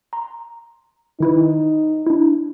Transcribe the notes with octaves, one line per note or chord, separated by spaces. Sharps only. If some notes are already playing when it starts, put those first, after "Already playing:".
A#5 C6
D#3 D#4 E4 B4
D4 E4